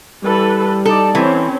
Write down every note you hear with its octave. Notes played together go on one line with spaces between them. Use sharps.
E3 G3 A4 B4
D#4 A4 D5
E3 C4 C#4